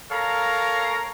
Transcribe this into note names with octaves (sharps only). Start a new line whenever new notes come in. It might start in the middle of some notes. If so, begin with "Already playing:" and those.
A4 A#4 C#5 F5 A#5